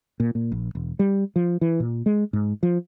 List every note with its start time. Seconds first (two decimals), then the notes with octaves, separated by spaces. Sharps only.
0.20 A#2
0.35 A#2
0.52 A#1
0.75 E1
0.99 G3
1.36 F3
1.61 E3
1.80 A#2
2.06 G#3
2.33 G#2
2.63 F3